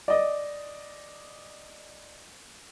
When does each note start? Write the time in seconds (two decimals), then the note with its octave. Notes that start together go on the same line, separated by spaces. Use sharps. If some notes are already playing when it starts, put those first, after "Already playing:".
0.08 D5 D#5